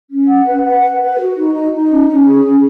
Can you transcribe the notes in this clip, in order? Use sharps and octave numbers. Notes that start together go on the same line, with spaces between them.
C#4
F#5
B4
F#5
B4
B4
F#4
D#4
D#4
D#4
C#4
C#4
G#4
C#4